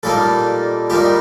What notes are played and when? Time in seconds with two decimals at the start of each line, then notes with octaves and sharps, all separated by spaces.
0.03 A#2 G3 A#3 D#4 A4
0.90 A#2 G3 A#3 D#4 G4